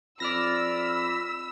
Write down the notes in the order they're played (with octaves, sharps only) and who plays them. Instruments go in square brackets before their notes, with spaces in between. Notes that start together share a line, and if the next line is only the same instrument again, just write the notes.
[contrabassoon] F2 [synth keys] D5 F6 A#6 [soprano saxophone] B5 [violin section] E6